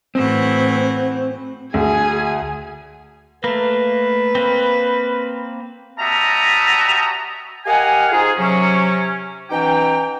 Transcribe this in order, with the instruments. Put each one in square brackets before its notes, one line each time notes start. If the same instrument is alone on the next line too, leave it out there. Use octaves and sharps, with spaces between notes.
[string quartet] A2 E3 F#4 [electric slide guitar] C4
[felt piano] D2 [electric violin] G#4 G#5
[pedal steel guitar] A3 A#3 [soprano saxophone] B4
[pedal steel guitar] A#3 C4
[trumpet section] G3 F#4 D#5 E5 A5 A#5
[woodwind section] G4 A#4 D#5 F5 F#5 G#5
G#2 D#4 F4 G#4
C3 F#3 C#4
B2 E3 C#4 D#4 G5